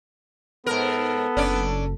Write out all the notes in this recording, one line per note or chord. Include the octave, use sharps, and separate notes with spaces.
G#2 B3 A4 A#4
F#1 C#4 D4 D5